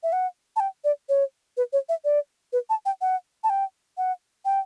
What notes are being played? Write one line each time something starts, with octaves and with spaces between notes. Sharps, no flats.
E5
F#5
A5
G5
D5
C#5
B4
C#5
E5
D5
B4
A5
G5
F#5
A5
G5
F#5
G5